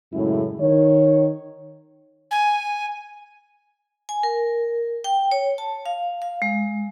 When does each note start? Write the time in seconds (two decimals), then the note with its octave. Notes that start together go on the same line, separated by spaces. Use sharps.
0.13 F#2 A2 C#3 G#3 E4
0.60 D#3 C#5
2.31 G#5
4.09 G#5
4.23 A#4
5.04 G5
5.31 C#5
5.58 A5
5.86 F5
6.22 F5
6.42 G#3